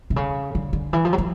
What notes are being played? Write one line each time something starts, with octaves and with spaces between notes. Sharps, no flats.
C3
C#3
D3
D3
E3
F3
F#3
F3